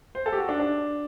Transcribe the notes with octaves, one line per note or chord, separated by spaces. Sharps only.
C5
A4
G4
F#4
D4
D4